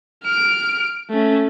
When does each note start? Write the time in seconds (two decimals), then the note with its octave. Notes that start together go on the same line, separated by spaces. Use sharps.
0.24 F6 D7
1.10 A3 C#4